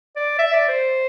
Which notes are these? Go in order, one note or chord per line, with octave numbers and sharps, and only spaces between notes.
D5
E5
D5
C5